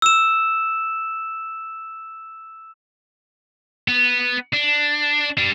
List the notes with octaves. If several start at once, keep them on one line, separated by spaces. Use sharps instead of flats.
E6 E7
B3
D4
G3 D4